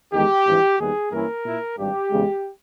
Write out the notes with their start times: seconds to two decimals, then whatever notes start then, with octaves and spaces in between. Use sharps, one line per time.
0.13 E2 D#3 G#3 G4
0.46 G#1 G2 E3
0.79 D#2 D#3 G3 B3 D#4 G#4
1.12 G2 E3 A#3 C#4 E4 A#4
1.45 A#2 A#3 E4
1.78 G#1 G2 G3 G4
2.12 E2 C#3 G#3